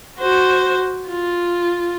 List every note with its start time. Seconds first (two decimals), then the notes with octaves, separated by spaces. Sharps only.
0.19 F#4 C5
1.08 F4